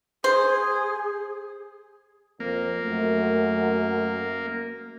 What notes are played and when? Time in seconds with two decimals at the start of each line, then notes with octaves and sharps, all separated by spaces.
0.24 G#4 C5
2.40 F2 A#3
2.82 F#2 A3